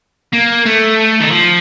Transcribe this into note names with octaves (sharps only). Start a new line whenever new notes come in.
A#3
A3
D#3
F3